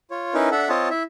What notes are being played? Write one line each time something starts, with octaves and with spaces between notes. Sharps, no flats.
F4 C#5
C#4 D#4 E4 A#4 B4
D4 A4 E5 F#5
C4 F4 C#5 D#5 A5
E4 E5